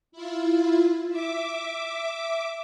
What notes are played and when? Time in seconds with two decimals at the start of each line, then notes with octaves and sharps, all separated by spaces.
0.12 E4 F4
1.09 E5 D6